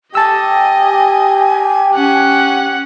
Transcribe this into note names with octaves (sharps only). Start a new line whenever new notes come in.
G4 D#5 G#5 A5 E6
C#4 F#5